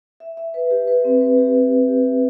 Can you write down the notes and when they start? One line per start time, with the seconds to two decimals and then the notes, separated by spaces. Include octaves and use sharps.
0.20 E5
0.37 E5
0.54 B4
0.71 G4
0.88 B4
1.04 C4
1.21 B4
1.38 G4
1.55 C4
1.71 B4
1.88 G4
2.05 E5